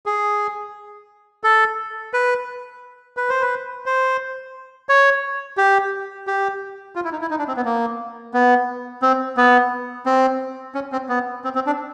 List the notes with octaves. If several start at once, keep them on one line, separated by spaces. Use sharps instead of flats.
G#4
A4
B4
B4
C5
B4
C5
C#5
G4
G4
F4
E4
D#4
E4
D#4
D4
C4
B3
A#3
B3
C4
B3
C4
C#4
C4
B3
C4
C4
D4